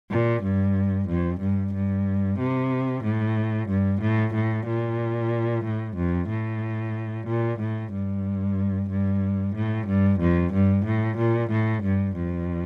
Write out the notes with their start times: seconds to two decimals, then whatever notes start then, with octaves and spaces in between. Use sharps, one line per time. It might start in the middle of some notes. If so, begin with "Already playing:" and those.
0.11 A#2
0.43 G2
1.08 F2
1.41 G2
1.74 G2
2.39 C3
3.04 A2
3.69 G2
4.02 A2
4.34 A2
4.66 A#2
5.64 A2
5.97 F2
6.29 A2
7.27 A#2
7.60 A2
7.92 G2
8.90 G2
9.55 A2
9.88 G2
10.20 F2
10.54 G2
10.86 A2
11.18 A#2
11.51 A2
11.83 G2
12.16 F2